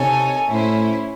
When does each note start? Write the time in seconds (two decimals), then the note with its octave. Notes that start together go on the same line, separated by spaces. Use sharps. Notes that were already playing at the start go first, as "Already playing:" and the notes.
Already playing: C3 D#4 A4 C#5 G#5
0.50 A2 C#4 E4 C5